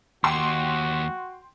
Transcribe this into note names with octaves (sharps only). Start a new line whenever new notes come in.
D#2 F#4 G5 C6